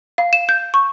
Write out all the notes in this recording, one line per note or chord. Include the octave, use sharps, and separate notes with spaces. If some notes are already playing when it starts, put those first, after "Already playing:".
F5
E7
G6
C#6